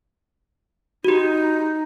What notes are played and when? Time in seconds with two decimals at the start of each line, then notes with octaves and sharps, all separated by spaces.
1.04 D#4 F#4 G4